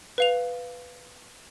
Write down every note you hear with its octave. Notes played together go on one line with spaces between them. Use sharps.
B4 F5 F7